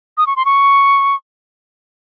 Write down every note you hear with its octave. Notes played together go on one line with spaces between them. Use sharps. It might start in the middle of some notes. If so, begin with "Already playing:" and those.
D#6
C#6
C6
C#6